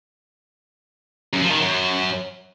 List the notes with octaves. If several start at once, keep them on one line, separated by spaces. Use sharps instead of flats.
F#2
F3
D#3
F#2